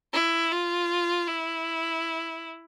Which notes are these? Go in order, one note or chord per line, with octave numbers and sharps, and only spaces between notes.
E4
F4
E4